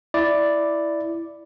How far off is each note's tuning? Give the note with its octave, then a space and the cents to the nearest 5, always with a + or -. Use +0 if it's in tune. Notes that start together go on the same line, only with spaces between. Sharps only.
E4 +0 D5 +0